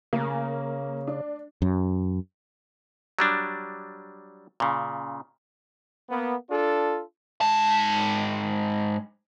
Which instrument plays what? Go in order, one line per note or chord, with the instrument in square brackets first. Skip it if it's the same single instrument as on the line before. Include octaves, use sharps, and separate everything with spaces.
[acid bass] C#3 [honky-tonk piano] A#3
[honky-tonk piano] D4
[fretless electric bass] F#2
[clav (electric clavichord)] F#3 G3 D4
A#2 C#3
[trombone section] A#3 B3
D4 F4 A4
[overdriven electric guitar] G#2 A5